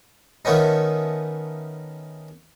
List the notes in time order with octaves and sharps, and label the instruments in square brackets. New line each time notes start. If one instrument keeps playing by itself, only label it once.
[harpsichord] D#3 A3 B3 C#4 D#4